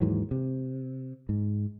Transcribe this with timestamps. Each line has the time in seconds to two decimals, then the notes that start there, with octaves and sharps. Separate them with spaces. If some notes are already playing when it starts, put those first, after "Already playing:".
0.01 D#2 G#2 E3 F#3
0.31 C3
1.29 G#2